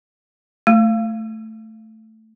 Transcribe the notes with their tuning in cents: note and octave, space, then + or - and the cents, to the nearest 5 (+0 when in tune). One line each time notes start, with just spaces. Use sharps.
A3 +0